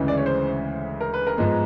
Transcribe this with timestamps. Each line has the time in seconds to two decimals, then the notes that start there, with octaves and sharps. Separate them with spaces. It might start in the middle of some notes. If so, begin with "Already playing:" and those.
Already playing: D2 C#3 E3 G#3
0.08 D5
0.17 C#5
0.26 C5
1.01 A#4
1.14 B4
1.27 A#4
1.37 G#2 F3 G#3 B3